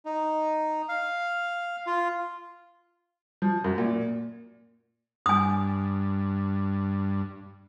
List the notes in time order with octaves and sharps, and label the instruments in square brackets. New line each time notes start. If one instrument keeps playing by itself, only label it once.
[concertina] D#4
F5
F4
[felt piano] F3
F#2
A#2
[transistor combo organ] G2 [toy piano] G#5 D#6